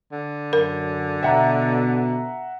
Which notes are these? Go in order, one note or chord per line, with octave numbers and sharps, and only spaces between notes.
D3
F#2 A#4
B2 E5 F#5 A#5